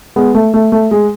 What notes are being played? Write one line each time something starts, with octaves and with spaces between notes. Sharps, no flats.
G#3 B3
A3
A3
A3
G#3